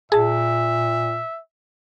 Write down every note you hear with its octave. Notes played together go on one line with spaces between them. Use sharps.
A#2 G#4 E5 A5